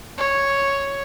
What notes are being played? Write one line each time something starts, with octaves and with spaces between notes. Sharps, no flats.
C#5